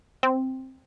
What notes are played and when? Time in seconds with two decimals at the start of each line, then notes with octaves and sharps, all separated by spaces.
0.23 C4